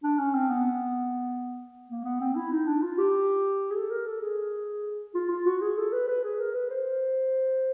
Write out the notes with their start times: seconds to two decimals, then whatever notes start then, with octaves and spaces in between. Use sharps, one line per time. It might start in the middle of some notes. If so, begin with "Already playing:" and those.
0.03 D4
0.19 C#4
0.34 C4
0.50 B3
1.90 A#3
2.05 B3
2.21 C4
2.36 E4
2.52 D#4
2.67 D4
2.82 F4
2.98 G4
3.71 G#4
3.76 A4
3.91 A#4
4.07 A4
4.22 G#4
5.15 F4
5.30 F4
5.46 F#4
5.61 G#4
5.77 A4
5.93 B4
6.08 B4
6.23 G#4
6.39 A#4
6.55 B4
6.70 C5